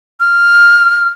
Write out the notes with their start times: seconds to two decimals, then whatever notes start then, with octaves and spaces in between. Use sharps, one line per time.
0.20 F6